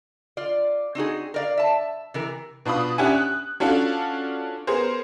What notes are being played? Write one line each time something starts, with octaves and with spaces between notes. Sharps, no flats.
F4 D5
C4 D#4 F#4 G#4
A#4 D5 F5
E5 A5
C3 E3 A#4
B2 D4 F4 B5 D#6
C#4 D4 G4 E5 F#5 G#5
F#6
C#4 D4 F4 F#4 A4
B3 G#4 A#4 C5